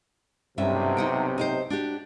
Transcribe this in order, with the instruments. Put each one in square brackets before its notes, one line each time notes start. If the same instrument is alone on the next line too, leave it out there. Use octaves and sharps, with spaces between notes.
[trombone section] B1 C3 [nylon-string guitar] G2 C#4 E5
[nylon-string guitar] D#4 F#5 G5
D#4 G4 C5
D4 F#4 G4